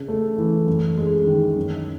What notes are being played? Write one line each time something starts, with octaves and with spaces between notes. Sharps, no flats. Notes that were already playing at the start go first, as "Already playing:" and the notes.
Already playing: C#3
A3
E3
F#2
G#3
D#3
F#2